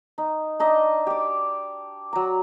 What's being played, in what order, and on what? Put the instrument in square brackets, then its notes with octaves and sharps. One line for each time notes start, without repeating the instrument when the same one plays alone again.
[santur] D#4
D4 D#4 D#5 E5
G4 D5
F#3 A#5